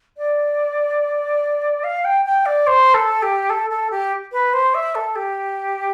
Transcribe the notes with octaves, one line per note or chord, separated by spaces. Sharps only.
D5
F5
G5
G5
D5
C5
A4
G4
A4
A4
G4
B4
C5
E5
A4
G4